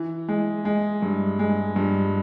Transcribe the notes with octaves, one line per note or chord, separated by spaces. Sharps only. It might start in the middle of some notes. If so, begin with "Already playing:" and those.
Already playing: E3
G#3
G#3
G2
G#3
G2